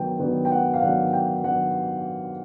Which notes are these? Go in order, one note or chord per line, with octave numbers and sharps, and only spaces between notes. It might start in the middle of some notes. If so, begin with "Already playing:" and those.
Already playing: D#3 F#3 B3 D4 G5
D#3 F#3 B3 D4
G5
F#5
F5
D#3 F#3 B3 D4 F#5
G5
D#3 F#3 B3 D4 F#5